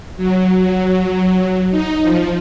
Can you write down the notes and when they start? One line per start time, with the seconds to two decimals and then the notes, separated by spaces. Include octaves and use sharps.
0.17 F#3
1.71 D#4
2.03 F3